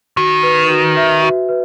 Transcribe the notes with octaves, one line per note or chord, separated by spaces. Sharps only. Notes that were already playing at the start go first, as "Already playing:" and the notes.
D#3 F#4
B4
F#4
E5
F#4
B4